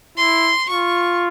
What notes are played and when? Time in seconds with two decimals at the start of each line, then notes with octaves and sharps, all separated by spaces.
0.17 E4 C6
0.69 F4 C#6